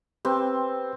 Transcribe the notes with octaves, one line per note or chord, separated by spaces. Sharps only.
C4 G4 B4 C5